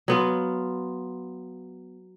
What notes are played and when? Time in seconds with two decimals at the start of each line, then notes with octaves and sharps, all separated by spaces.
0.08 F#3 B3 F4